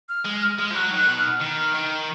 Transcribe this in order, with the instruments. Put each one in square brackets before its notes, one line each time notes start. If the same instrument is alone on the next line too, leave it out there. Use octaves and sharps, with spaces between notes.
[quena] F6
[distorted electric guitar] G#3
G#3
F3
[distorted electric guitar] F#3 [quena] F#6
[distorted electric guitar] D#3
[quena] F#6
[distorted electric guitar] B2
[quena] F6
[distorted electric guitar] D#3 [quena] F6
[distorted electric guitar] D#3